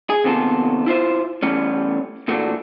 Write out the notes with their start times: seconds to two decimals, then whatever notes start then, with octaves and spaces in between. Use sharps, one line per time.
0.10 G#4
0.24 D#2 C3 B3 F4 A4
0.86 E4 F4 C5 E5
1.43 E3 G3 A3 B3 C#4
2.28 A#2 E3 A3 D4 F4 F#4